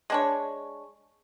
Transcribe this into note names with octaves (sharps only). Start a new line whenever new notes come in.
G#3 D4 C#5